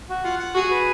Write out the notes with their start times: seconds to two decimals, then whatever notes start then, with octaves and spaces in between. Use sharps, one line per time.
0.09 F#4
0.24 F4 F#5
0.39 F#5
0.55 F#4 G#4
0.71 B4